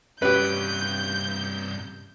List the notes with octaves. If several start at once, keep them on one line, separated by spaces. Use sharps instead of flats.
G2 C3 C#4 G4 B4 G6